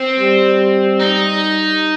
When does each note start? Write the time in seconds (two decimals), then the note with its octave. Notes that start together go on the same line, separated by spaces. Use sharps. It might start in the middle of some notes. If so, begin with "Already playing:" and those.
Already playing: C4
0.20 G3
1.00 D#4